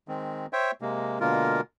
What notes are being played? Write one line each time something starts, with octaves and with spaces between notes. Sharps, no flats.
D#3 G#3 C4
C5 C#5 E5 G5
C3 G#3 A#3
B2 D3 G#3 A#3 F4 A#4